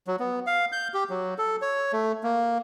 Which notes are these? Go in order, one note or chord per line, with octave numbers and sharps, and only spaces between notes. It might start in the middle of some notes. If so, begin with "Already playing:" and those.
F#3
B3
F5
G6
G4
F#3
A4
C#5
A3
A#3